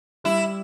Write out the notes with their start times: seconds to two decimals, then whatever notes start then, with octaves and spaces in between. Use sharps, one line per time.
0.24 G3 E4